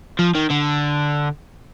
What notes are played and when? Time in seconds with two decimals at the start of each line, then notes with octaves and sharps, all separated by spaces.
0.19 F3
0.35 D#3
0.50 D3